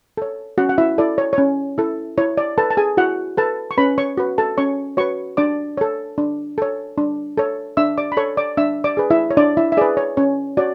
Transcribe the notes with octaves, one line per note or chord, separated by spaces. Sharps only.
A4 C#5
C#4 F#4 F#5
F#5
E4 E5
E4 A4 D5
C#5
C#5
C#4
E4 A4
E4 C#5
D5
A4 B4 A5
A5
G#4 G#5
E4 F#4 F#5
A4 B4 A5
C#6
C#4 B4 B5
C#5 C#6
F#4 B4
A4 A5
C#4 C#5 C#6
F#4 B4 C#5 C#6
D4 D5 D6
A4 C#5
D4
A4 C#5
D4
A4 C#5
D4 E5 E6
D5 D6
B5
A4 C#5 C#6
D5 D6
D4 E5 E6
D5 D6
G#4 B4
E4 E5
C#5
D4 D5
E4 E5
E5
G#4 B4 D5
C#5
C#4 C#5
F#4 C#5 D5